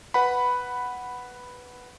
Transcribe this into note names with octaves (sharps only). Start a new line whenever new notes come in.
B4 F#5 B5